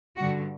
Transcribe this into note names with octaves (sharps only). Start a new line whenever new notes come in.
G2 D3 G3 F#4